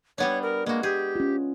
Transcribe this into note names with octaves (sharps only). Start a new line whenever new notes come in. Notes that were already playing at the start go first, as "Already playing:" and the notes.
G3 B3 D4 C#5
A#4
G#3 A#3 F#4
G4 G#4
C#4 F4